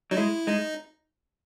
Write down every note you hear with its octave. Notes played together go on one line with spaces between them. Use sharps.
F#3 D#4
G#3 E4
G#3 D#4